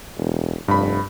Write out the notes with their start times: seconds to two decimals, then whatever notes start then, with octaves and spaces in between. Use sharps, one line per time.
0.17 E1
0.68 F1 G2 B5